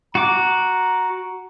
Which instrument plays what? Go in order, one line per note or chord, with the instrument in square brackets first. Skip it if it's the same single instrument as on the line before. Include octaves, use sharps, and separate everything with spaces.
[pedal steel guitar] F#4 D6 [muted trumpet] A#5